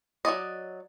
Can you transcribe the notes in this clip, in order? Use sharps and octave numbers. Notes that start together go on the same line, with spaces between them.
F#3 C4 D5 D#5